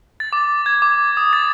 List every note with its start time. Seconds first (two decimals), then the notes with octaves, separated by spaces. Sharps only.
0.20 A6
0.33 D6
0.66 G#6
0.82 D6
1.17 D#6
1.33 A6